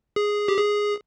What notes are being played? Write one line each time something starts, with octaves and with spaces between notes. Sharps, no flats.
G#4
G4
G#4